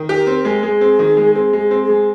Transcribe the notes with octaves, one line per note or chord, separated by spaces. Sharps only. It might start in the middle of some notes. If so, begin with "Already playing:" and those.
Already playing: D#3
G4
A#4
C4
A#4
G#3
G#3 G#4
C4
D#3
G#3
C4 G#4
G#3
G#4
C4
G#4
G#3